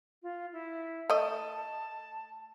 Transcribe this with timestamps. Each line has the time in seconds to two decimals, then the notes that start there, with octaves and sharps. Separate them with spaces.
0.23 F4
0.53 E4
1.10 A3 D#5 A5